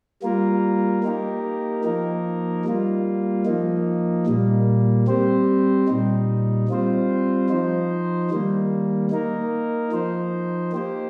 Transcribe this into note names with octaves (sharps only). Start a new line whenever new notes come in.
G3 A#3 F4 A#4
A#3 D#4 G4 A#4
F3 A#3 D#4 A#4
G3 A#3 F4
F3 A#3 D#4
A#2 G3 A#3
G3 C4 G4 C5
A#2 G3 D#4
G3 C4 F4 C5
F3 D#4 C5
D#3 G3 A#3
A#3 D#4 A#4
F3 D#4 C5
A#3 G4 C5